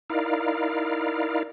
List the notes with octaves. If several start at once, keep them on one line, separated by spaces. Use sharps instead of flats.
D#4 E4 A#4 D5 F5